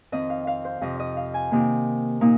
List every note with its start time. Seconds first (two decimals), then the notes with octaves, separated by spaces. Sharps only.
0.12 F2 D#3 C4 D#5
0.30 F5
0.47 F5
0.65 C5
0.81 F2 C3 F3 D#5
1.00 D#5
1.17 F5
1.34 G#5
1.51 C3 D#3 A#3
2.21 A#2 A#3 D#4